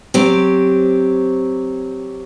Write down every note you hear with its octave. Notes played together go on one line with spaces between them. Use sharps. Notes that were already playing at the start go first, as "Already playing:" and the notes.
F#3 C4 G4